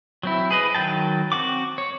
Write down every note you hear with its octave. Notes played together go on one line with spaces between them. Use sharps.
F#3 C4 E4
G#4 B4 D#5
D#3 F#3 G5 A5
C4 F#4 F#5 D6
C#5